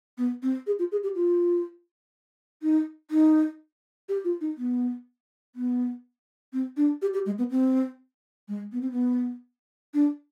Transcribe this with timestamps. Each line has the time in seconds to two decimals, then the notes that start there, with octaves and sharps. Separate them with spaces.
0.18 B3
0.43 C4
0.67 G#4
0.79 F4
0.92 G#4
1.03 G4
1.15 F4
2.63 D#4
3.11 D#4
4.09 G4
4.24 F4
4.41 D#4
4.58 B3
5.55 B3
6.53 C4
6.77 D4
7.02 G4
7.14 G4
7.26 G#3
7.38 B3
7.51 C4
8.48 G#3
8.72 B3
8.81 C4
8.92 B3
9.94 D4